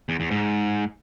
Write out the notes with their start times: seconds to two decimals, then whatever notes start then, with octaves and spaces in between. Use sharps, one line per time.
0.09 E2
0.20 E2
0.31 G#2